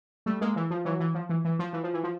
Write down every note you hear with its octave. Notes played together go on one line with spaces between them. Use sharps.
G3 A3
G#3 A#3
E3
F3
E3 F#3
E3
F3
E3
E3
F3
E3
F3
E3
F3